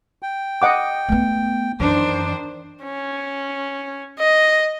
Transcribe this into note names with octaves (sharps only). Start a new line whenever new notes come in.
G5
D#5 F#5 D6
A3 B3
F#2 D#3 E3 D4 C5
C#4
D#5